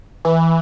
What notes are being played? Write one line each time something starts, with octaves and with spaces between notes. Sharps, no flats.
E3